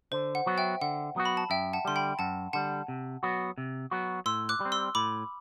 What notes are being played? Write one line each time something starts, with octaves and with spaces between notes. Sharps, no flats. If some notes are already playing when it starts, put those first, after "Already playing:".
D3 C5
F#5
F#3 B3 F#4
E5 G5
D3 F#5
F#3 B3 F#4
B5
A5
F#2 E5 G5
F#5 A5
D3 G3 C6
G5 B5
F#2 F#5 A5
D3 G3 F#5 A5
C3
F#3 B3 F#4
C3
F#3 B3 F#4
A2 C6 E6
D6 F#6
G3 C4
C6 E6
A2 B5 D6